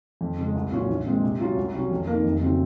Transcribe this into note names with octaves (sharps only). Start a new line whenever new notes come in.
F2
C#3 G#3
C2
A#2 F#3 C#4 F4
A#1
A#2 G#3 C4
C3
F#3 C#4 F4
C2
C3 F#3 C#4
F2
D#3 A#3
F1
C#3 F#3 C4